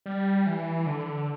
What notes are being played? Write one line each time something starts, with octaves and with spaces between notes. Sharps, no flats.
G3
E3
D3